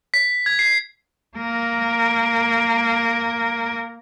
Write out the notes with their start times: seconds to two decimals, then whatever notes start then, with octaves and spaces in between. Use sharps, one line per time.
0.14 B6
0.46 G#6
0.59 C7
1.37 A#3 A#4